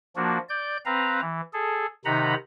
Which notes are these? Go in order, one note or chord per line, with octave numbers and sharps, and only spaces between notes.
F3 A#3 D4 F#4
D5 G6
C4 B4 F5 A#5
E3
G#4 A4
C3 D#3 D#4 F#5 A#5 B5